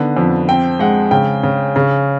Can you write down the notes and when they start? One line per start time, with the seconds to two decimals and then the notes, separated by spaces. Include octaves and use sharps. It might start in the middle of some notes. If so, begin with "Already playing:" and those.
Already playing: D3 D#3 B3
0.17 F2
0.48 C4 G5
0.79 G#3 F#5
1.11 C#3 G5
1.43 C#3
1.76 C#3